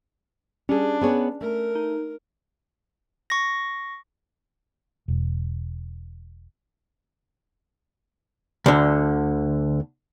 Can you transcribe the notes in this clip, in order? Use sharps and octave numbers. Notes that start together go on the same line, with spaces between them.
G3 C#4 D4 G#4
B3 G#4 C#5
A3 A#4
D#4
C#6 A#6
E1
D2 D3